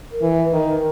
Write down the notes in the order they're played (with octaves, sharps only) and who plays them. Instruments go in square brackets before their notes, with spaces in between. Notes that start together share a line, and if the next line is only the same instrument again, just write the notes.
[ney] A#4
[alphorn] E3
[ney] B4
[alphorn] D#3 [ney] A#4